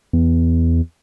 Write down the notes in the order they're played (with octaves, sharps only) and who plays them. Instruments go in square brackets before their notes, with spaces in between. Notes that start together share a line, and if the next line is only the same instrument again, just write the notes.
[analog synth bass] E2